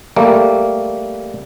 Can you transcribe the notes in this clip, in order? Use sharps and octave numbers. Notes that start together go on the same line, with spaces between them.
G3 A3 A#3